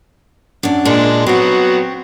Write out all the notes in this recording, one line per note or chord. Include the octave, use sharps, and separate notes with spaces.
F#2 D4
A#2 G#3 D4
F#3 B3 C4 F#4